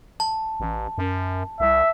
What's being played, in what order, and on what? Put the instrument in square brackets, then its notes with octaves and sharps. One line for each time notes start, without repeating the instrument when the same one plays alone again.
[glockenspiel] A5
[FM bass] A1
F#2
[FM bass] C2 [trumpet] E5